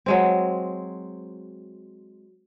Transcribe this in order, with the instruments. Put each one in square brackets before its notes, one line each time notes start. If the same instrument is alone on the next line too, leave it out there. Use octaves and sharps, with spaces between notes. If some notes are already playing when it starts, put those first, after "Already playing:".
[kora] F#3 G#3 C4